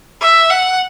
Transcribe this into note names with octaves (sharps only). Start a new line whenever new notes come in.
E5
F#5